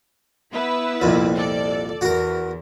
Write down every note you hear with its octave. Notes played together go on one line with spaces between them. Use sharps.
B3 E4 B4
C2 F2 A#2
A4 D5
E2 F#4 A#4